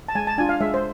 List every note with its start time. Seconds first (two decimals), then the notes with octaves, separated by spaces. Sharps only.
0.08 A5
0.15 G#3 G#5
0.27 A5
0.38 D4 F4 G#5
0.49 F5
0.60 G#3 E5
0.74 C5